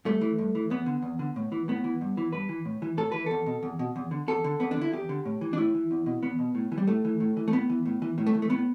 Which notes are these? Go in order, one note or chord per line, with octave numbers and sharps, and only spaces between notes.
G2 A3
E3
G2
E3
E2 B3
D3
E2
D3
A2
E3
A2 B3
E3
G2
E3
G2 B4
E3
A2
E3
A2 A4
E3 B4
E2 A4
B2
E2
B2
E2
D3
E2 A4
D3
E2 B3
D4
D3 E4
E2 G4
D3
A2
E3
D4
A2 E4
E3
E2
B2
E2 B3
B2
A2
E3
G3
A2 A3
E3
A2
E3
A3
A2 B3
E3
A2
E3
A2
A3
E3
A3
A2 B3